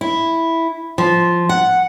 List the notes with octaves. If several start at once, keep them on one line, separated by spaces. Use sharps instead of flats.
E4
F3
F#5